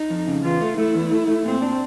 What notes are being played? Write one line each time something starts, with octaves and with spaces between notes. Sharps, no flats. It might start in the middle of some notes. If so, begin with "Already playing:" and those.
Already playing: D#4
F2
C#3
E2 F4
A3
A3 E4
E2
A3
A3
A#2 C4
D4